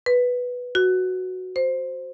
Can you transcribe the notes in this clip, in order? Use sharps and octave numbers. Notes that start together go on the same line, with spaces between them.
B4
F#4
C5